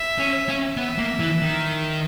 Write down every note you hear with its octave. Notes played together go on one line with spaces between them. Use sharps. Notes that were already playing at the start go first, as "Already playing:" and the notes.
Already playing: E5
C#4
C#4
B3 E5
A#3
E3
D#3